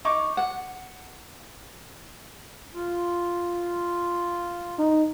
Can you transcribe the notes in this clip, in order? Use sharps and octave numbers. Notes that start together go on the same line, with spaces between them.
D#4 C#6 D6
F#5
F4
D#4